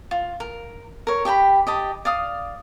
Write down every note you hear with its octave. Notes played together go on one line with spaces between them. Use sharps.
F4
A#4
A#4 C#5
G4 G5 A5 B5
G4 D#5 A5
D5 F5 D#6